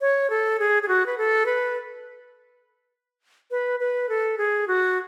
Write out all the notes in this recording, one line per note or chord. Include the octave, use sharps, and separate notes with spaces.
C#5
A4
G#4
G#4
F#4
B4
A4
B4
B4
B4
A4
G#4
F#4